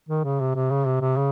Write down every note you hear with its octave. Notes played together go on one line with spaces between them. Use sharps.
D#3
C#3
C3
C3
C#3
C3
C3
C#3